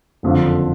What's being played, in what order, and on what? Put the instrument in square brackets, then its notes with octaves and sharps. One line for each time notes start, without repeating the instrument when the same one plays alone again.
[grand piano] F#1 F2 D3 F3